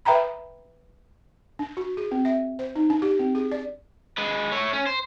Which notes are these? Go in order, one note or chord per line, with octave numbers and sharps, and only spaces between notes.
B4 E5 G5 A#5 B5
D4
F#4
G#4
C4
E5
C5
D#4
D4
G4
C4
G#4
D5
G#3 B4
A3 C#5
C#4
C5